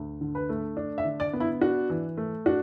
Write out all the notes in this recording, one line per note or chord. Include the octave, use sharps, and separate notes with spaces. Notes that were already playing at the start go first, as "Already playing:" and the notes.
Already playing: D2
D3
B4
A3
D4
E5
D3
D5
B3
E4
D4 F#4
E3
A3
D4 F#4